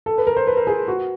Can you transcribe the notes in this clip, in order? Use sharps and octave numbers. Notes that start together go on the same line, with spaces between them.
A4
B4
A#4
C5
B4
A#4
G#4
F#4